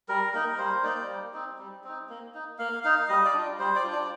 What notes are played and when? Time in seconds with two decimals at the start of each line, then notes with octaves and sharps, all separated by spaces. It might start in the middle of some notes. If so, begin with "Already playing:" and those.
0.09 G3 A#4
0.33 A#3 D#4 A#4
0.58 G3 C5
0.84 A#3 D#4 D5
1.08 G3
1.34 C4 D#4
1.59 G3
1.84 C4 D#4
2.09 A#3
2.34 D#4
2.59 A#3 F5
2.83 D#4 F5
3.09 G3 D#5
3.25 D5
3.34 D4 F4
3.59 G3 C5
3.76 D5
3.84 D4 F4
3.92 D5